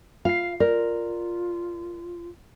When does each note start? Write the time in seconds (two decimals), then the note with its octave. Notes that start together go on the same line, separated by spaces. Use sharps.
0.25 F4 F5 C7
0.60 F4 A#4 D5